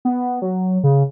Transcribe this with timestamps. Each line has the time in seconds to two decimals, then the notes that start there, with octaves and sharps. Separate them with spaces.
0.05 B3
0.42 F#3
0.84 C#3